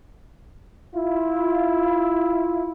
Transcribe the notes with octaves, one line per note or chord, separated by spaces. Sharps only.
E4 F4